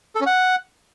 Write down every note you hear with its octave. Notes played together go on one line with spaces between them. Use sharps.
A4
C#4
F#5